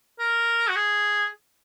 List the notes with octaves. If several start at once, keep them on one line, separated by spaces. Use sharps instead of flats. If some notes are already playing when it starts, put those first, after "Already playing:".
A#4
F#4
G#4